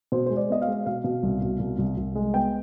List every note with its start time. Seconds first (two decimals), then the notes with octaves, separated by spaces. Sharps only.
0.12 B2 C5
0.26 G#3 C5
0.37 D5
0.49 B3 D#5
0.62 F5
0.67 G#3
0.86 B2 F5
1.04 B2
1.23 C2
1.42 B2
1.59 C2
1.79 C2
1.97 C2
2.15 G#3
2.34 B3 G5